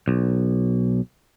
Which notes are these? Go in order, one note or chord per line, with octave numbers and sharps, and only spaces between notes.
B1